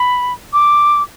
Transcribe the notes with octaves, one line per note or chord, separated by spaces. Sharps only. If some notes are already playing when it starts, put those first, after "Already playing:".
Already playing: B5
D6